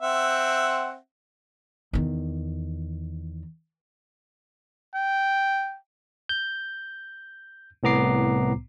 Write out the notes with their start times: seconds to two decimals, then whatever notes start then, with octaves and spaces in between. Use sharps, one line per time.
0.01 C4 E5 F#5
1.93 E2 D#3
4.95 G5
6.29 G6
7.83 C2 A2 B3 A#5 D6 C7